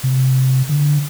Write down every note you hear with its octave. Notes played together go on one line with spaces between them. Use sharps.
C3
D3